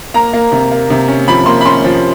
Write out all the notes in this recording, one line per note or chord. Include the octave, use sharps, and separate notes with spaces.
A#3 A#5
A#3
C3
A#3
C3
C#4
F3 B5
A#3 C6
B5
C#4 C6
F3